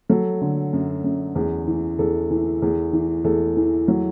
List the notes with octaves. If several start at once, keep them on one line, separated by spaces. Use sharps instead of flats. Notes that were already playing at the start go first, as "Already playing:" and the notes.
F#3 A4
D3
F#2
F#2
E2
E3
E2 A4
E3
E2
E3
E2 A4
E3
F#3